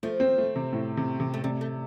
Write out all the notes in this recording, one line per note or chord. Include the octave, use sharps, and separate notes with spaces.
F3 A3
C4
A3
C3
A2
C3
C3
A3
C3 G3
A3